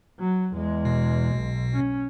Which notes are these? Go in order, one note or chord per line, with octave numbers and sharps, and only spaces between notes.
F#3
E2 G#3
B2
B1
C#4